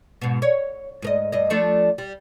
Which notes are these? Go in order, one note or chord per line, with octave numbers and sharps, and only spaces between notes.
G#2 B2
C#5
G#2 A#4 D#5
G2 D#5
F3 A3 D4
G3